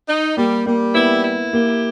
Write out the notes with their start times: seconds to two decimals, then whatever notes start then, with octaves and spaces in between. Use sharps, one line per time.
0.09 D#4
0.37 G3 A#3
0.66 G3 A#3
0.95 B3 E4
1.24 E4
1.53 A#3 G4